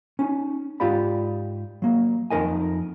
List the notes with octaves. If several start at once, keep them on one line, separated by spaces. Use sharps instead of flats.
C#4 D#4
G#2 F4 G4 D5 B5
F#3 A#3
F2 D#4 A#4 D#5 G#5